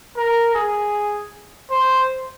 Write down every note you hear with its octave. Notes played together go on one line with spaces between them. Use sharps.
A#4
G#4
C5